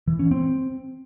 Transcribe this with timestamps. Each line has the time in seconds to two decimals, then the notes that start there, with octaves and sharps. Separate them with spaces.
0.08 E3
0.19 C#4
0.31 C4